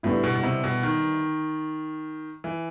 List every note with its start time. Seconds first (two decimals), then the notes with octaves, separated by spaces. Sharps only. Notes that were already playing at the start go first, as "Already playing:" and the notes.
0.03 A2 D3 G3 B3 E4
0.24 B2
0.36 B2
0.43 C3
0.64 B2
0.83 D#3
2.44 E3